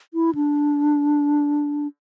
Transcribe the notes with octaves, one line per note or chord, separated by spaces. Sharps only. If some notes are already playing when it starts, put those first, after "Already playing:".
E4
D4